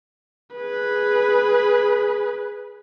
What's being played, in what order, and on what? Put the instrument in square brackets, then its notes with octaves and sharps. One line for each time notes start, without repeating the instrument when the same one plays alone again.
[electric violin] G#4 B4